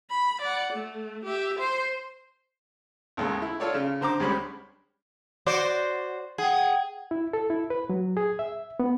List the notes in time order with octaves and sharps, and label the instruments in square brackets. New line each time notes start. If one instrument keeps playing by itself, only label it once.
[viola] B5
D5 F#5
A3
G4 E5
C5 C6
[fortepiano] A1 D#2 G#3
E4
F4 A4 C#5 D5
C#3
D3 C5 A#5 D6
D2 G3 G#3 C#4 B5
[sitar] F#4 C5 D5
[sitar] G#4 [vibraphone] F#5 G5
[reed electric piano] E4
A4
E4
B4
F#3
G#4
E5
B3